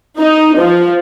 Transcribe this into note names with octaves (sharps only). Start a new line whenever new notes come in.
D#4
F3